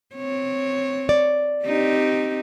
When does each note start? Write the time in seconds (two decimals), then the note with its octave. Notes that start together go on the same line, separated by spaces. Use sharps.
0.15 C4 C#5
1.09 D5
1.64 C4 D#4 G4